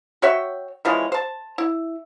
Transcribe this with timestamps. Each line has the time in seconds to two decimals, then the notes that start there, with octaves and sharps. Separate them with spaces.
0.22 F#4 C#5 E5 G5
0.85 E3 F3 G#3 C#4
1.12 C5 A5
1.58 E4